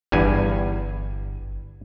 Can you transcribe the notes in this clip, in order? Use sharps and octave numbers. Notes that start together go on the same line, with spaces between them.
G1 E2 G2 G#5